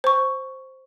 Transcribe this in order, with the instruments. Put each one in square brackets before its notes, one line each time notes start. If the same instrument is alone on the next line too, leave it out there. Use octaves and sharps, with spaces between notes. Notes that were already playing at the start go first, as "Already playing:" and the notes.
[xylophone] C5 C#6